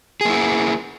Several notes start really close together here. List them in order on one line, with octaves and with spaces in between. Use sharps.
G#4 A#3 E4